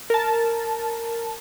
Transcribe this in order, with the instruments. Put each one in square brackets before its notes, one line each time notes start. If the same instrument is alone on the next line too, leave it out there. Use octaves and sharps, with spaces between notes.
[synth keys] A#4 A5